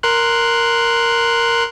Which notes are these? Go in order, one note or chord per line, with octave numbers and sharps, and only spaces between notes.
A#4 C6 F#6